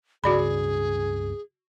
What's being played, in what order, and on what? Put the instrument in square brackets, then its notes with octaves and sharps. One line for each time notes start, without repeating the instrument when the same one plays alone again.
[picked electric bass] C#2 G2 C#3 [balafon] F#4 D5 B5 [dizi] G#4